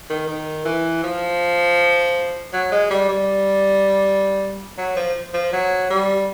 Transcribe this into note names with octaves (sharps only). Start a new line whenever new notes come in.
D#3
D#3
E3
F3
F#3
G#3
G3
G3
F#3
F3
F3
F#3
G3